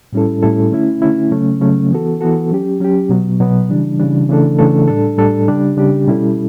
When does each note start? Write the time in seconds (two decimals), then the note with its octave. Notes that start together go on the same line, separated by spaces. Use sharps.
0.13 A2 G3 C#4 E4 A4
0.42 A2 G3 C#4 E4 A4
0.72 D3 A3 C#4 E4
1.02 D3 A3 C#4 E4
1.31 C#3 F#3 A3 C#4
1.61 C#3 F#3 A3 C#4
1.91 E3 B3 F#4 A4
2.21 E3 B3 F#4 A4
2.51 F#3 C#4 G4
2.80 F#3 C#4 G4
3.09 B2 F#3 B3
3.40 B2 F#3 B3
3.69 C#3 E3 G3 D4
4.00 C#3 E3 G3 D4
4.29 C#3 E3 A3 D4 A4
4.59 C#3 E3 A3 D4 A4
4.88 A2 G3 D4 A4
5.17 A2 G3 D4 A4
5.48 C#3 G3 D4 G4
5.77 C#3 G3 D4 G4
6.07 B2 G3 C#4 E4 A4